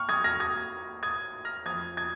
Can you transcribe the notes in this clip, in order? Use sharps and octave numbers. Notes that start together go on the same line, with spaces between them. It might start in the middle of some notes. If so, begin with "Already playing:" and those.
Already playing: C#6 F6
D#6 G#6
F6 A#6
D#6 G#6
D#6 G#6
F6 A#6
F2 F3 D#6 G#6
D#6 G#6